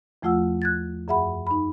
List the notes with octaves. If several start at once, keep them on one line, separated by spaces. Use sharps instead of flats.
E2 F3 A3 F4 F#5 E6
F#6 G#6 A6
F#2 G#4 E5 F#5 B5
D#4 B5